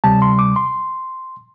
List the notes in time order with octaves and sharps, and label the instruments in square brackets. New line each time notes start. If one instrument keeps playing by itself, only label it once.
[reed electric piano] D2 C3 G3 A5
C6
D6
C6